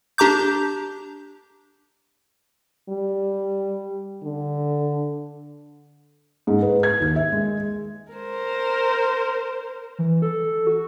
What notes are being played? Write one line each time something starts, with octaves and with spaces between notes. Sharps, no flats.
D4 G4 A#5 D6 G6
G3
D3
G#2
B4
G#6
D#2
E5
G#3
A#4 C5
E3
A4
F#4